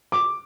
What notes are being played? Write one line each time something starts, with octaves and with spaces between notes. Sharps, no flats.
D6